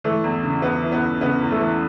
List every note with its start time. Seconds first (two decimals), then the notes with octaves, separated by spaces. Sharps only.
0.04 E3 A3
0.23 E2
0.43 C#3
0.62 E2 B3
0.82 E3
0.92 B3
1.02 E2
1.21 C#3 B3
1.41 E2
1.51 A3
1.60 E3